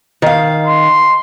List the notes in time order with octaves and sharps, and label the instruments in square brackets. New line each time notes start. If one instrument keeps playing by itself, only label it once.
[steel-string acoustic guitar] D#3 F5
[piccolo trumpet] C6